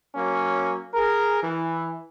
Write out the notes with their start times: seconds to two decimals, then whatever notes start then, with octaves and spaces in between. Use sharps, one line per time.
0.15 F#3 A#3 C#4
0.94 G#4 A#4
1.42 E3